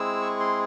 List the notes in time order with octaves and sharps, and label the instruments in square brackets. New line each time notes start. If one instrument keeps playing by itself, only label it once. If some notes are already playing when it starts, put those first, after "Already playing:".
Already playing: [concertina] G#3 C4 E4 G#4 E6
C#6
C6